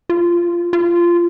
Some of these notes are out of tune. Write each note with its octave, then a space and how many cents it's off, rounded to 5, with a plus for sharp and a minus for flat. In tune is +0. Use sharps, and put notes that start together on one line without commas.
F4 -10
F4 -15